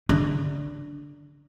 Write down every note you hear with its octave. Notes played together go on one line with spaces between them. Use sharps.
D3